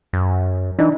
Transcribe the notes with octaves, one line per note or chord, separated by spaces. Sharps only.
F#2
E3 D4 D#4